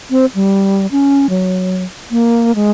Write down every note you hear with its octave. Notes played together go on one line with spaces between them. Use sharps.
C4
G3
C#4
F#3
A#3
G#3